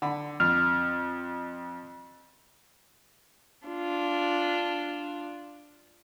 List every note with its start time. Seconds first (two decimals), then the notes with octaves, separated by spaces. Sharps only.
0.02 D3 B5
0.40 F2 F6
3.67 D4 F4